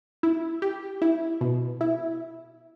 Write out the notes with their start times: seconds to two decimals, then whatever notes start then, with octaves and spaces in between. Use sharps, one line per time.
0.23 E4
0.62 G4
1.02 E4
1.41 B2
1.81 E4